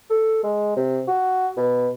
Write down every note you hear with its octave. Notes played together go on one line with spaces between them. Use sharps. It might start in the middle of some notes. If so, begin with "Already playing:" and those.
A4
G#3
C3
F#4
B2